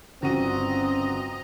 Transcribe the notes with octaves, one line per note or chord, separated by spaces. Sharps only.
G1 C#3 C4 F#4 D#5 A#5 D#7